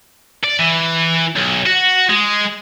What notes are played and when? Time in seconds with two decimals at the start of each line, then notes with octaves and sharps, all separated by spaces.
0.44 D5
0.59 E3
1.36 B1
1.66 F#4
2.09 G#3